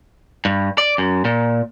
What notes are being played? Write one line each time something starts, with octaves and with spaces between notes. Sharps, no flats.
G2
D5
F#2
A#2